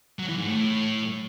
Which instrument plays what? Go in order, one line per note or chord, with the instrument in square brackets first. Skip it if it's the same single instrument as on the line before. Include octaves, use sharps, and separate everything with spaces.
[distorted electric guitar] F#3
E3
G#2
A2